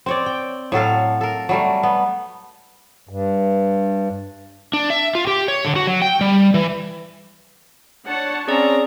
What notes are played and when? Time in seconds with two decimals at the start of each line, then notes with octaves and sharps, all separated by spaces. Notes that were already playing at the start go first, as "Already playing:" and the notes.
0.06 C4 C#5 D5
0.26 G5
0.72 A2 F#3 A4 F5
1.21 A4 A#4
1.49 F#3 G3 A3
1.83 B3
3.09 G2
4.73 D4
4.90 E5
5.15 F4
5.27 G4
5.48 C#5
5.65 D3
5.76 F#4
5.87 F#3
6.02 G5
6.21 G3
6.54 E3
8.07 D4 C#5 F#5 A5 C#7
8.48 C4 C#4 G#4 D5 A#5